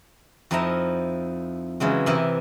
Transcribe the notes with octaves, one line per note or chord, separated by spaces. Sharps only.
F2 F3 D#4 E4 A5 A#5
C#3 E3 F#3 G#3
C3 E3 A#4 D#5 E5 B5